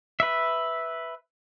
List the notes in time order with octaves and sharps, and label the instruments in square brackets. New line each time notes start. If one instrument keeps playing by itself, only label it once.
[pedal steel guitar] B4 E5